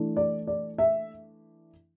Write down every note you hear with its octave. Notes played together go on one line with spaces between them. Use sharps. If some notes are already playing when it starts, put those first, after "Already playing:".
Already playing: E3 A3 D4
D5
D5
E5